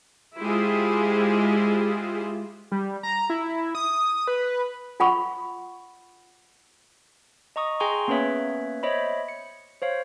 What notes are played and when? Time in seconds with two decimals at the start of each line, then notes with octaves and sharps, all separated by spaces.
0.38 G#3 E4 F4 G4 G#4 C5
2.72 G3
3.03 A#5
3.30 E4
3.75 D#6
4.28 B4
5.00 F4 F#5 B5 C#6
7.56 D#5 A#5 C#6 D#6
7.80 G#4 G5 G#5 A#5 C6 C#6
8.08 A#3 B3 C#4 B4 C#5 E5
8.83 C5 C#5 D#5 E5 B5
9.29 C#7
9.82 C5 C#5 F5